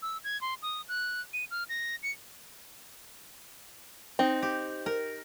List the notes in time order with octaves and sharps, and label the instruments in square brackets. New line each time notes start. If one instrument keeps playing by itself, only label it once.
[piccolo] E6
G#6
C6
D#6
F#6
D#7
F6
A#6
C#7
[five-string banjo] C4 [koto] D#4
[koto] G4
A#4